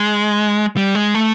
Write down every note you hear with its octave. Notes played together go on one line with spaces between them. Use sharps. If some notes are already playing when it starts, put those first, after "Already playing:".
Already playing: G#3
G3
G#3
A3